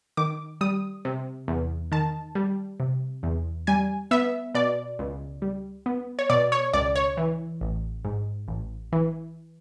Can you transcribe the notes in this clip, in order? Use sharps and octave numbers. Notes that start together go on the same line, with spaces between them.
D#3 D6
G3 D#6
C3
E2
D#3 A5
G3
C3
E2
G3 G#5
B3 E5
B2 D5
C#2
G3
B3
C#5
B2 D5
C#5
C#2 D5
C#5
E3
A1
G#2
A1
E3